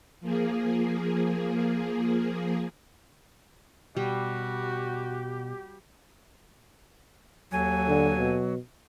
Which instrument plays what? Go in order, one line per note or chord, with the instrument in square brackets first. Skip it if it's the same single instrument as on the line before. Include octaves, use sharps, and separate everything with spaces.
[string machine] F3 A#3 G#4
[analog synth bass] B2 [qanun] G3 [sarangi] F#4 [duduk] G4
[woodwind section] D#2 A4 G#5 [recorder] F#3
[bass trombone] D3
B2